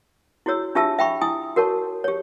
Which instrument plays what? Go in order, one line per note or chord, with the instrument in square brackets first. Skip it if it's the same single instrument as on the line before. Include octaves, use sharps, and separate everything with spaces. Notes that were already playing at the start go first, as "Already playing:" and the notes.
[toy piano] E4 F#4 G#4 C#5 E6
D4 F4 G4 E5 A5 E6
E5 G5 B5 C#6
E4 G#5 D#6
F#4 A#4 C#5 A5 C#6
G4 C#5